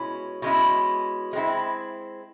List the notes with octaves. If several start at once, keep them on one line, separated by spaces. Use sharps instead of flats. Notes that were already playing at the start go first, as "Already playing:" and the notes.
Already playing: B2 G#3 C#4 E4
B2 G#3 C#4 E4
G#3 C4 E4